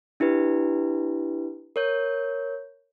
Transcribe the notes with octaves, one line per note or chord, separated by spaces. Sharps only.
D4 E4 G4 B4
A#4 C#5 G6